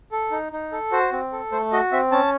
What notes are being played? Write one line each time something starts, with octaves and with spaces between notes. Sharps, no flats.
A4
D#4
D#4
A4
F#4 C5
C4
A4
A3 C5
F#4 D#5
C4 E5
C#4 A5